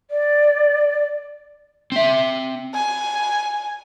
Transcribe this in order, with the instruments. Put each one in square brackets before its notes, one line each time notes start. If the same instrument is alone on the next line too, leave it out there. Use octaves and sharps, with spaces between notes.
[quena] D5
[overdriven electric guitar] C4 E5
[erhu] G#5